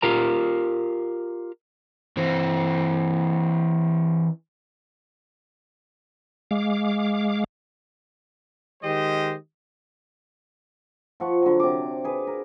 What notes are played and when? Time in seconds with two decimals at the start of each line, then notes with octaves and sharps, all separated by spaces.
0.02 F4 G4 A#4 A#5
2.17 E3 C4
6.51 G#3 F5 D6
8.83 D#3 G#3 G4 C5 D#5
11.20 F3 F#5 C#6
11.43 D3 F#3
11.60 C3 D6
12.04 G#4 B4
12.27 A#4